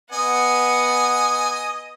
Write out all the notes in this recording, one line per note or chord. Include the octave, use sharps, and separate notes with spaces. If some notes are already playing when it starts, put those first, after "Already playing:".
B3 D#5 F#5 G#5